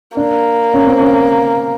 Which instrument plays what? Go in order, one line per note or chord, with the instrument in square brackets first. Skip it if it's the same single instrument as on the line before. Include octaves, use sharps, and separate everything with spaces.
[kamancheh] A#3 [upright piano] D4
[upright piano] C#4
C4
C#4